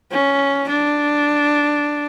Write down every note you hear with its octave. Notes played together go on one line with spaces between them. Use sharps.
C#4
D4